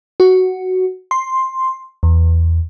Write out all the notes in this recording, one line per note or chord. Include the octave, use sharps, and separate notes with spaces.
F#4
C6
E2